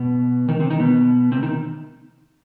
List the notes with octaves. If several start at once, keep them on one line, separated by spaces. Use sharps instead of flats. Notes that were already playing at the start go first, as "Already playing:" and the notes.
Already playing: B2 B3
D#3 D#4
C3 C4
D#3 D#4
B2 B3
C3 C4
D#3 D#4